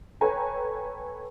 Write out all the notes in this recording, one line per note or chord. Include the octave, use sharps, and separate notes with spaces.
A4 B4 C#5 G5 G#5 A#5